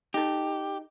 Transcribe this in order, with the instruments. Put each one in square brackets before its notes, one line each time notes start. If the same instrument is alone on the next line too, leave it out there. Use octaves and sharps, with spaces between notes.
[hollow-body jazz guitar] D#4 A4 [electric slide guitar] G4